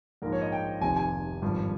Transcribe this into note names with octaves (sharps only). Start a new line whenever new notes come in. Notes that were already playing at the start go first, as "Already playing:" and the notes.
A#1 G#2 F3 A#4
C#5
D#5
G5
F1 F2 C3 D#3 G#5
G#5
G#1 G2 F3